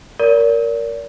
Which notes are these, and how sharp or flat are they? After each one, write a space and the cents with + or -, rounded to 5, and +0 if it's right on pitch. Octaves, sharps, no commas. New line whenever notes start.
A#4 +0 D5 -40